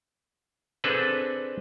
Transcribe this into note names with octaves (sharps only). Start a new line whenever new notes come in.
C4 D4 G#4 A4 B4